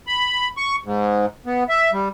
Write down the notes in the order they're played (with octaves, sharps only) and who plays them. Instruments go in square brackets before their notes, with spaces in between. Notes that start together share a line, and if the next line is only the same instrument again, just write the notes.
[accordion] B5
C#6
G#2
B3
E5
G3